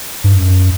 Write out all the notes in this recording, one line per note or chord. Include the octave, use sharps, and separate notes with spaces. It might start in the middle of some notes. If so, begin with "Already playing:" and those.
G2
F#2